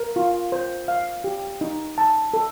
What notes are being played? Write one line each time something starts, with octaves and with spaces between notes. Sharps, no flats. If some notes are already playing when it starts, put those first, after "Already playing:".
Already playing: A#4
F4
C5
F5
G4
D#4
A5
A4